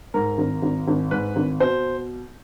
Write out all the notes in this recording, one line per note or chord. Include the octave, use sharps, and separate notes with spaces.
G#2 A#4
G#1
G#1
G#1
G#2 B4
G#1
B2 C5